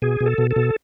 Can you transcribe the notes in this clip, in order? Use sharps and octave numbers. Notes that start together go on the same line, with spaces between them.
B2 G#4
B2
A4
B2
A4
B2